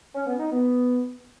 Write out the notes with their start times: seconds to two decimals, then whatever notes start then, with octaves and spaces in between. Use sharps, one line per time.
0.15 C#4
0.27 B3
0.39 D#4
0.51 B3